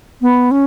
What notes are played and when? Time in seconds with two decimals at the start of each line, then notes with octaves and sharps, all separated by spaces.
0.22 B3
0.51 C#4